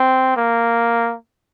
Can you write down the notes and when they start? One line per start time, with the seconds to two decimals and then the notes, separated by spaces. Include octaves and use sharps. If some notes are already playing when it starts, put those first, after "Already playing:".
Already playing: C4
0.37 A#3